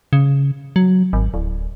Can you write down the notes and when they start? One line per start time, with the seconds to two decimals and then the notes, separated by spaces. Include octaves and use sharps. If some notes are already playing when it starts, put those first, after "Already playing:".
0.13 C#3
0.76 F#3
1.13 G#1
1.34 D1